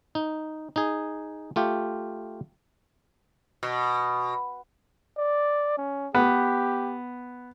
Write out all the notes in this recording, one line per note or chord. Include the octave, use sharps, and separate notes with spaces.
D#4
D#4 G#4
A3 F4 G4
B2
D5
C#4
B3 G4